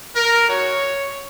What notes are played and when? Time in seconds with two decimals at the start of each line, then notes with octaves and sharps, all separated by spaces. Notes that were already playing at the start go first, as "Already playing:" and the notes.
0.15 A#4
0.48 G#3 D#4 F#4 C#5